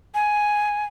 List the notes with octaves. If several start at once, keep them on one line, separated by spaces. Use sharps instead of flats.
G#5